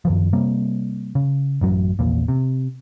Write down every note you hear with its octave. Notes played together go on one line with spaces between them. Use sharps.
F#2 D#3 F3
C3 G3 A#3
C#3
A1 F#2 F#3
A#1 E2 A#2
C3